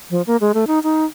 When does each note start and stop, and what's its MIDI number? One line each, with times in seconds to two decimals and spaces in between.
0.10 0.22 53
0.27 0.37 58
0.41 0.52 56
0.54 0.65 57
0.67 0.79 63
0.83 1.05 63